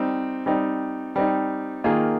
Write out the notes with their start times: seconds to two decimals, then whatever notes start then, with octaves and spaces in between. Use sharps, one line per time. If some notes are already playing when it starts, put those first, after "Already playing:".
Already playing: G3 C4 D#4
0.46 G3 C4 D#4
1.16 G3 C4 D#4
1.84 D#3 A#3 F4 G#4